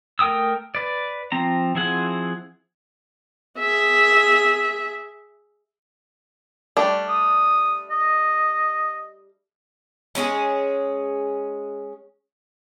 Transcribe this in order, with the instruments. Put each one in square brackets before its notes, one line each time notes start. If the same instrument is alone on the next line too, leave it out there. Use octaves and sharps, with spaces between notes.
[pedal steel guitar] A3 A#4 G5 D#6 E6
B4 D5
F3 C4 A#5
F3 C4 E4 G#4 F#5
[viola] G#4 E5
[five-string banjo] G3 A3 D4
[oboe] D#6
D#5
[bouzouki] G#3 C#4 E4 G#4